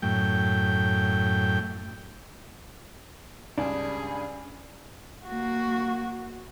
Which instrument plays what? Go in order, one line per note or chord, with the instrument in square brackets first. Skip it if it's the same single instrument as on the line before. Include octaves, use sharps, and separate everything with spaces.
[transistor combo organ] F#2 A2 G5
[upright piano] C#2 G2 [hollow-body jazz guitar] D4 [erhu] G#4
[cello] A#3 F#4